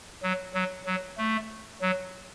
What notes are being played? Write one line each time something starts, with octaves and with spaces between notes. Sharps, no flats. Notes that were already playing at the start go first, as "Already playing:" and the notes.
F#3
F#3
F#3
A3
F#3